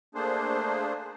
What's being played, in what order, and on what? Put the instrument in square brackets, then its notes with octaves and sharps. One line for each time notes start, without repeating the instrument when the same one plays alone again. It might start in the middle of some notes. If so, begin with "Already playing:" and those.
[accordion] A3 A#3 D4 G#4 C5